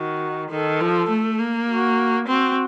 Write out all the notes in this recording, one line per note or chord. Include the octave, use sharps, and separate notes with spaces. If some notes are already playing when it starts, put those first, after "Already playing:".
Already playing: D#3 F#4
D#3 A4
F3
A3
A#3
F#4
C4 F#4